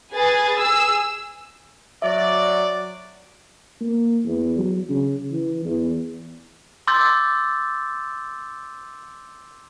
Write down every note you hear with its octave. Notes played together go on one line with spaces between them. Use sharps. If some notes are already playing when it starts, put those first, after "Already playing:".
G#4 B4 G#5 A6
G#4 E6
F#3 D5 E5
A#3
E2
F#3
C#3
E3
E2
C6 D6 E6 G6 A6